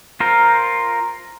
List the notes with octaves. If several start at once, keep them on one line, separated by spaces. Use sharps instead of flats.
F4 A#4 C5